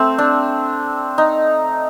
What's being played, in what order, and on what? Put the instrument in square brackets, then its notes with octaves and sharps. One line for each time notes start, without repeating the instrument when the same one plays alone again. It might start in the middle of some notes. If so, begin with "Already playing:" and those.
Already playing: [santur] A3 C4
D4
D#4